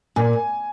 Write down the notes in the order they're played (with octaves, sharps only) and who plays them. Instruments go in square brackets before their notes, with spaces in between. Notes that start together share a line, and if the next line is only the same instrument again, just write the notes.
[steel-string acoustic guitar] A#2 [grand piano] G#5